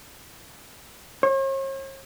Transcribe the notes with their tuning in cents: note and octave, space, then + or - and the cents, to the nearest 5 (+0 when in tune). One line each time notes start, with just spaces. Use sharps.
C#5 -45